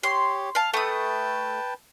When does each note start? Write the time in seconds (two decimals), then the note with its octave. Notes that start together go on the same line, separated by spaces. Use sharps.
0.03 G4 C#5 C6
0.55 F5 A5
0.74 A3 B4 G5 A5 D#6